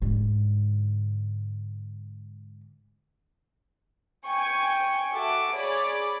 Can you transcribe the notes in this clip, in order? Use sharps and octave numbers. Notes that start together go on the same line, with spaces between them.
G#2 D3
G5 G#5 C#6
F#4 A4 E5 D6
G#4 C#5 D5 G#5 B5 D6